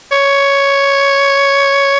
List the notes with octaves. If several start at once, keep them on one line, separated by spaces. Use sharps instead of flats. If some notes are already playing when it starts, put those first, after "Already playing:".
C#5